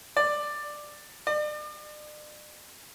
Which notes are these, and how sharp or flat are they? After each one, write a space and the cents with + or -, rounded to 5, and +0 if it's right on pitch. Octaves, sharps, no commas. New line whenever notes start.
D5 +10
D5 +40